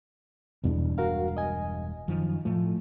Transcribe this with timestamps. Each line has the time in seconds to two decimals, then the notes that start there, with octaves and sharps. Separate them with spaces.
0.64 E1 E2 G2 B2 D4
0.98 F#4 A#4 F5
1.37 D#5 G#5
2.08 F#2 D#3 F3
2.45 A2 F3 A3